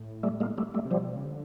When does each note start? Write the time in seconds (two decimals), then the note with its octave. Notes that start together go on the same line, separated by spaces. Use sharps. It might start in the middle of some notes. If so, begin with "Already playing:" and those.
Already playing: A2
0.23 G3 A3
0.40 G#3 A#3
0.58 G3 A3
0.74 G3 A3
0.85 C3
0.91 B2 F3 G3
1.15 C#3
1.25 D3